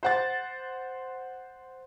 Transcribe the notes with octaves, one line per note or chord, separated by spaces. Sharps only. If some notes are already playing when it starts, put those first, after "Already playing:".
C5 F#5 A6